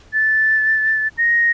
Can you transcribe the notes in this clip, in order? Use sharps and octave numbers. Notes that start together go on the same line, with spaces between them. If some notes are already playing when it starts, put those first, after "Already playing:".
A6
A#6